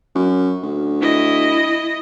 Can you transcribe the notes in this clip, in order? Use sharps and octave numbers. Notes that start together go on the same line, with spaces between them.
F#2
D2
E4 D#5